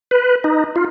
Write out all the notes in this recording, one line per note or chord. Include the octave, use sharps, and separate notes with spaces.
B4
D#4
F4